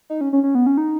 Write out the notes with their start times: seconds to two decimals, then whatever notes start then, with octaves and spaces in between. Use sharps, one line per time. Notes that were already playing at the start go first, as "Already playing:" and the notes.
0.10 D#4
0.21 C#4
0.33 C#4
0.44 C#4
0.55 B3
0.66 C#4
0.77 D#4